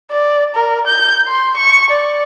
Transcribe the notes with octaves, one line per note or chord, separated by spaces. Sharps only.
D5
A#4
G6
C6
C#6
D5